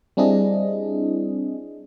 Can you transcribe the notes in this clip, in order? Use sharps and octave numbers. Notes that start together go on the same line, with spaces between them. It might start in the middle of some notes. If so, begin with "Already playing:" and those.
G3 C4 D4 E4 G#4 D#5